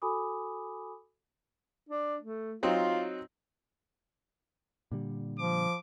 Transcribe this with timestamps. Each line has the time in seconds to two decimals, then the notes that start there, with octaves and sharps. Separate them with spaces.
0.02 F#4 A4 G#5 B5 D6 D#6
1.89 D4
2.23 A3
2.63 F#3 C4 D#4 F4
4.92 A#2 D3 G3
5.39 F3 D6